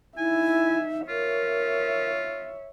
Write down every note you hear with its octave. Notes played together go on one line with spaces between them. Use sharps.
D#4 E4 E5 G#5
F4 A#4 C#5 E5